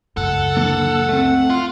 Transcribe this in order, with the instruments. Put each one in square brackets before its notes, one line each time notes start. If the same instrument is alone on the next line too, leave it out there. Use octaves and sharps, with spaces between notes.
[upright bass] C#2 F#2 [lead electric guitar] A4 [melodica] F#5
[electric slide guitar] D3 E3 A#3
A3 C4
[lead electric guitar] F4